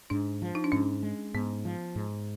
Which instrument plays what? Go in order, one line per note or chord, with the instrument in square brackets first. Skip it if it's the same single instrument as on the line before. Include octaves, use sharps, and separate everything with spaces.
[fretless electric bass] G#2 [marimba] D4
[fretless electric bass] F3
[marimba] D#4
D4
[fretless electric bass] G#2 [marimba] C#4
[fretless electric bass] G#3
[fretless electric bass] G#2 [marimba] B3
[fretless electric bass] F3
G#2